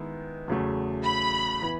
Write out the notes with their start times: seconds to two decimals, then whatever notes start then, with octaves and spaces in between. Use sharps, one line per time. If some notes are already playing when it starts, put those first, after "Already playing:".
Already playing: D#3 G#3 B3 E4
0.48 E2 C#3 F#3 A3
1.04 B5
1.62 E3 B3 E4